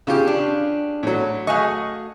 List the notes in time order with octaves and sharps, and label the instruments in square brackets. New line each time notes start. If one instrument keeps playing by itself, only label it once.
[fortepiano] C#3 F4 G4
[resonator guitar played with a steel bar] D4
[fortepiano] A2 F#3
[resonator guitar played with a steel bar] A3 F#4 D#5 [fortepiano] F5 G#5 C#6